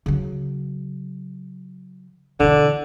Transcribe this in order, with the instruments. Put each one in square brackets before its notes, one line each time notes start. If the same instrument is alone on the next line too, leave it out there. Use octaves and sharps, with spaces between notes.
[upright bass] C#3 F#3
[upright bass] B2 E3 [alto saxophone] D3